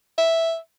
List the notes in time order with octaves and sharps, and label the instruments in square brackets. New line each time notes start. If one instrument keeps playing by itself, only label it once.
[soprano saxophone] E5